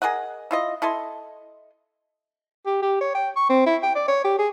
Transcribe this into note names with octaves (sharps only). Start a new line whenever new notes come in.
G#4 A#4 D#5 F#5
E4 F4 D#5
E4 A4 D#5 C6
G4
G4
C#5
G5
C#6
C4
E4
G5
D5
C#5
G4
G#4